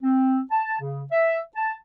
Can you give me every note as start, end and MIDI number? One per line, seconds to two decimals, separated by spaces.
0.02 0.40 60
0.51 0.80 81
0.80 1.03 49
1.12 1.39 76
1.56 1.75 81